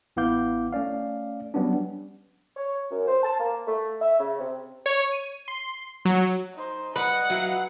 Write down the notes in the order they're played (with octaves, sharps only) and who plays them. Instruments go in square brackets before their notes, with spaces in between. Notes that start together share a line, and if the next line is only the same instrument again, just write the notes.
[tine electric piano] A1 B3 E4 F5 D6 G6
A3 C#4 D5 F5
F#3 G3 B3 C#4 D4
[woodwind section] C#5
F#2
C5
A5
A#3
A3
E5
C#3
C3
[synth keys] C#5
D#7
C6
F#3
[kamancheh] D#4 C5
[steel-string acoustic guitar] G3 [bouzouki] B4 [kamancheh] D#5 [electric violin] F#5
[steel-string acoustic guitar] F#3 E4 F5